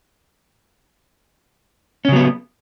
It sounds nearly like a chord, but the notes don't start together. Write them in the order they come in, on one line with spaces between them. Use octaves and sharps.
C#4 C#3 F#3 B3